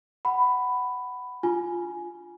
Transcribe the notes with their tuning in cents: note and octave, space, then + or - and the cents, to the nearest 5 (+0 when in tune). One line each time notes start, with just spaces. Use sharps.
F#5 +15 B5 +10
D4 +0 F4 +0 G#5 +10